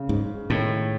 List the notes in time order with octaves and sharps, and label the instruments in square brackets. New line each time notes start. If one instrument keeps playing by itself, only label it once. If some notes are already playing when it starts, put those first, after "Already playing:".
Already playing: [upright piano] C#3
[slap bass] G#2 [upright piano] G#3
[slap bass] A2 [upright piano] D#3